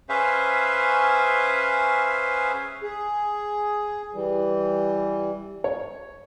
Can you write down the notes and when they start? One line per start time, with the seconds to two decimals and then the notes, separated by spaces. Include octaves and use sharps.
0.09 C#4 G#4 B4 C5 E5 F5
2.82 G#4
4.15 E3 G3
5.64 C#5